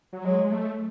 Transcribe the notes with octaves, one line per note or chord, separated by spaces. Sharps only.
F#3
F#3 G#3
G#3
A3